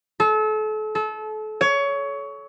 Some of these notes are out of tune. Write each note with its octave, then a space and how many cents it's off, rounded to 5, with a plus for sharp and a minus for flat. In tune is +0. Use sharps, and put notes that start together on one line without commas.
A4 -35
A4 -30
C#5 +20